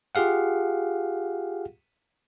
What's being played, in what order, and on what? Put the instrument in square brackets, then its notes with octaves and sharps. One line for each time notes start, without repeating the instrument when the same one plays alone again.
[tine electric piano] F4 G4 G#4 F5 F#5